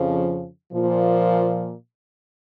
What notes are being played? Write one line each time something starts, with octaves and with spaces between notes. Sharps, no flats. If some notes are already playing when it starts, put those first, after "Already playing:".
Already playing: F2 C#3 F3
A#2 F3